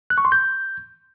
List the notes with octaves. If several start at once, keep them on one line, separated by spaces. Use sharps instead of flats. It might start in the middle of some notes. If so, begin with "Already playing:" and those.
F#6
C#6
C6
G6